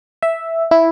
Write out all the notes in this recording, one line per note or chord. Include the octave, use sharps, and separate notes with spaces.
E5
E4